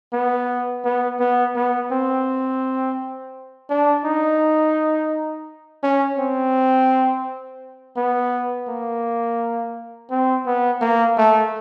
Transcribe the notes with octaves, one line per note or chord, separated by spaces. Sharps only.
B3
B3
B3
B3
C4
D4
D#4
C#4
C4
B3
A#3
C4
B3
A#3
A3